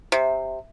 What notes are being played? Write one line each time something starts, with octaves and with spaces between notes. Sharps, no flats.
C3